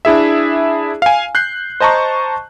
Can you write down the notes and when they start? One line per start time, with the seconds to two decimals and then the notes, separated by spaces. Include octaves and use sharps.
0.05 D4 E4 G#4 E5
1.02 F5 G#5
1.35 F#6 G6 C7
1.80 C5 D#5 A5 A#5 C#6